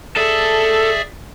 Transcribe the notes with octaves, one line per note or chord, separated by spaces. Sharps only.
G#4 A4 D5 E5